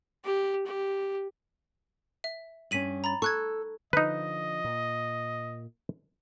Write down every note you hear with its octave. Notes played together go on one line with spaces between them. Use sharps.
G4
G4
E5
G2 C#4 B6 D#7 F#7
A#5 B5 A6
A4 C#6 F#6 G#6
D3 F3 D#4 B4 D#5
A#2